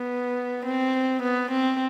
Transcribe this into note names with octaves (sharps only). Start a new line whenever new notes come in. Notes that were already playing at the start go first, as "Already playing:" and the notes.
Already playing: B3
C4
B3
C4